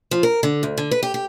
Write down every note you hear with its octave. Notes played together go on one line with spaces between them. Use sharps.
F3
A#4
D3
D2
D3
B4
G4
G4